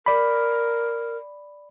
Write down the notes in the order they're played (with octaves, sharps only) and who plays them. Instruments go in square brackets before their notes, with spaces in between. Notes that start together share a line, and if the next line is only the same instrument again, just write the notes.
[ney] A#4 [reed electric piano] D5 B5